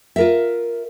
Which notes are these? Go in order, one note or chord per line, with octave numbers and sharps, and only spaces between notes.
F4 A#4 E5